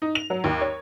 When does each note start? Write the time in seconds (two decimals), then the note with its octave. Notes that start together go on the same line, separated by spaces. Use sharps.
0.02 D#4
0.15 F7
0.30 F#3
0.44 D#2
0.61 C#5